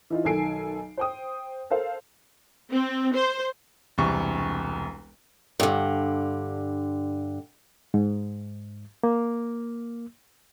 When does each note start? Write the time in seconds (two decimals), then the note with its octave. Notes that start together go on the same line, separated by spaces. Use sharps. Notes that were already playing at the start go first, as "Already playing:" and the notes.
0.10 E3 D#4 F4
0.24 B1 D#3 A4 G#5 C7 D7
0.97 C5 G5 D#6
1.70 A4 A#4 C5 F5
2.71 C4
3.14 C5
3.98 E1 C2 C#6
5.60 G2 D3
7.94 G#2
9.03 A#3